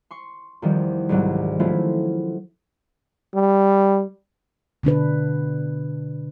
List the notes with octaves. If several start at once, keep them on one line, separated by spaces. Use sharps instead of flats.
C6 C#6
E2 D#3 F3 G3
C2 G#2 F#3 G3
F3 F#3 A3 C#4 E4 F4
G3
B2 D3 D4 B4